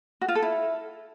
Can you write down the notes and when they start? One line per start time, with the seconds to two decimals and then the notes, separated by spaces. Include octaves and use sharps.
0.21 F#4
0.28 F4
0.35 A4
0.42 E4